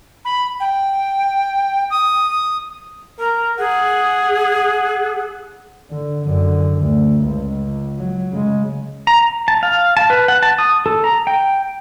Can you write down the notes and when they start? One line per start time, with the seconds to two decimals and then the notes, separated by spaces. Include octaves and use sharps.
0.25 B5
0.60 G5
1.91 D#6
3.19 A#4 A#5
3.59 G#4 F#5
5.90 D3
6.25 F#2 D3
6.78 D2
7.25 C#2
7.99 F#3
8.32 C#3 G#3
9.07 A#5
9.48 A5
9.63 F5
9.97 A5
10.10 B4
10.28 F#5
10.43 A5
10.59 D#6
10.86 A4
11.04 A#5
11.27 G5